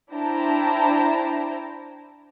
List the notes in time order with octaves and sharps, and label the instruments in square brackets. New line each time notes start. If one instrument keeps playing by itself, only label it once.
[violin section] D4 E4 C5 G5 A5 A#5